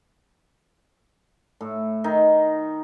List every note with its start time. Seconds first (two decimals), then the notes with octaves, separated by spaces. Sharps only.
1.61 A2
2.04 D#3 D#4